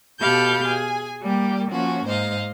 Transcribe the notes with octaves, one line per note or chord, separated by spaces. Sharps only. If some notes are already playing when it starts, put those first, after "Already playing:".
B2 G4 A4 F5 B5 G6
G#4 G#5
G3 A#3 G4
F3 A#3 C#4 F#4
G#2 C5 D#5 F5